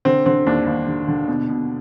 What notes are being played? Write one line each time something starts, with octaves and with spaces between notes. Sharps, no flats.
D3 C4
D3 C4
D#2 D4
D#2
D3
D3
B2
B2